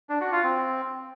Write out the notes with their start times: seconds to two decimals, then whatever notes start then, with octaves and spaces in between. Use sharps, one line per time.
0.09 D4
0.21 F#4
0.32 F4
0.44 C4